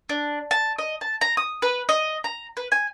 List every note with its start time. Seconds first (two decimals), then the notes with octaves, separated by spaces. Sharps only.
0.09 D4
0.51 A5
0.79 D#5
1.01 A5
1.21 A#5
1.37 D#6
1.62 B4
1.89 D#5
2.24 A#5
2.57 B4
2.72 G#5